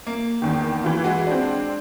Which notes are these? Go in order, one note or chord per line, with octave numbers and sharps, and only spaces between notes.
A#3
E2 D#3
E3 F4
G#3 F#4 F#5
C4 D4